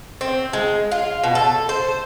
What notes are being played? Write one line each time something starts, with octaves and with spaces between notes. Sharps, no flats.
C4
G#3
F4
B2
A4
C5